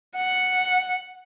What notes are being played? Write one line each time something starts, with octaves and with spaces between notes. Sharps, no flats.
F#5